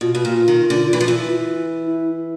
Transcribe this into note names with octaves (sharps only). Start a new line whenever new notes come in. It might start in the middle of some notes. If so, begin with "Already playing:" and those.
B2 F4
B2
A#2
D#3
D3
E3
F3
E3
E4